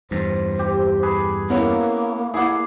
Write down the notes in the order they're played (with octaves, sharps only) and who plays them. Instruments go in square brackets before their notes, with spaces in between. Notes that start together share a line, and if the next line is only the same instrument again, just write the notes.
[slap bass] E2 G2 [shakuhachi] C5
[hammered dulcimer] G4
G#4 B4
[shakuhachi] A#3 [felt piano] B3 C#4 E4
[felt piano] E4 F#5 [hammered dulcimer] G#4 D5